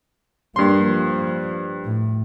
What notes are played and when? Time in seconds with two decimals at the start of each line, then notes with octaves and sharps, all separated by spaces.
0.56 G2 G3 A#3 C6
0.87 F3
1.85 A2